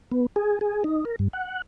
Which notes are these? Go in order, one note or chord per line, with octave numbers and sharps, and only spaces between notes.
B3
G#4
G#4
D#4
A#4
G2
F#5